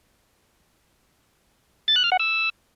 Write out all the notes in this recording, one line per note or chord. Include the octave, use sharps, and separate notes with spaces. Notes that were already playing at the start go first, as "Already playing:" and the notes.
A6
F#6
F6
F#5
E6